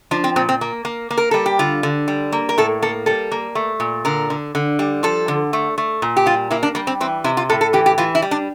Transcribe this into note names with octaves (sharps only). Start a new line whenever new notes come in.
F3 D4
C4
A#2 C4
C4
A#3
A#3
A#3
A#4
G3 A4
G4
D3 F4
D3
G3
A#3
A#4
A2 A4
A#3 A4
G3 A4
A#3
A3
A#2
D3 A#4
D3
D3
G3
F3 A4
D3
A3
A3
A#2
G4
G3 F4
A#3 E4
D4
G3 A#3
C4
E3 C4
C3 E4
F4
A2 A4
A4
E3 G4
G4
E3 F4
E4
G3
D4